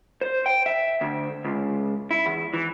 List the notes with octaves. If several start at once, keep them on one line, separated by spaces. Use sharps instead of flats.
C5
G5
E5
D2
C#2
E4
E2
E3